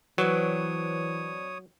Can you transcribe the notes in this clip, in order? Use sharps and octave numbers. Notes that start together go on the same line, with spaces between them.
E3 F#3 C4 D4 B4 C#5 D#6